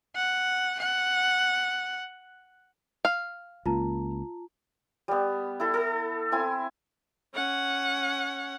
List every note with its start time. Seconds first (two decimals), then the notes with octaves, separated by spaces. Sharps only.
0.15 F#5
0.79 F#5
3.05 F5
3.66 C#2 A#3 F4 A5 A#5
5.08 G3 B3
5.60 E4 A4
5.74 A4
6.32 C4 E4 G#5
7.35 C#4 F#5